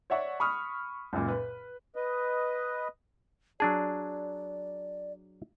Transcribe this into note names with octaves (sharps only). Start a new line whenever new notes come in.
C#5 D5 E5 F#5 C#6
B5 C#6 D#6 F6
C#2 F#2 A#2
B4
B4 D#5
F#3 D4 G#4 D5 A5